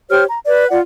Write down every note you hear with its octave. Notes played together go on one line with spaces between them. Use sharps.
G4 C5 C#5 F6
A#5
B4 D5
F4 D5 F#5